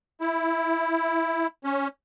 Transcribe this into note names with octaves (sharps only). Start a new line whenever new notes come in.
E4
C#4